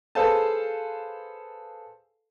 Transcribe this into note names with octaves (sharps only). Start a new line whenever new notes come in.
G#4 A4 B4 C5 F5 A5